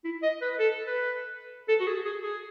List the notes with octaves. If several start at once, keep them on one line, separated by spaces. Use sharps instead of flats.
E4
D#5
B4
A4
B4
A4
F#4
G#4
G#4
G#4